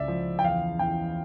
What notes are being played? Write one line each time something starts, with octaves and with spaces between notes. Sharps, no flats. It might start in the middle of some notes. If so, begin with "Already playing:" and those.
Already playing: C#2 D5 E5
F3
G5
E2 F5
E2 G5